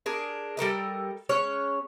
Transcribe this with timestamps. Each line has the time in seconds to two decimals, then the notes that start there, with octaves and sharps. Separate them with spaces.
0.06 D4 G#4 A#4
0.57 G3 A4 A#4 D#5
1.29 G#3 C#4 C#5